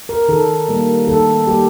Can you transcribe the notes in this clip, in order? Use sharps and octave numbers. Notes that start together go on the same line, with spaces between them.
A#4
D#3 A4
G3 A#3
D#3 A4
G3 A#3 G4